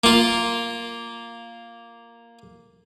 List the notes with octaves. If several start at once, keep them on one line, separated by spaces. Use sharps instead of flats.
A#3 F4